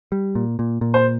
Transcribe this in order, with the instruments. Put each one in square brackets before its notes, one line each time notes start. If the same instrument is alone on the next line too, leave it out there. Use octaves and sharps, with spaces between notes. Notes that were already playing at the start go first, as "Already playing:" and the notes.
[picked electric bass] G3
A#2
A#2
A#2
[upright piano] C5